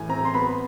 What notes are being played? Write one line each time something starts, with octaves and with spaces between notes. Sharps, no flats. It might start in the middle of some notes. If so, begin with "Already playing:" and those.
Already playing: A2 E3 G#5
C4 A#5
C6
B3 B5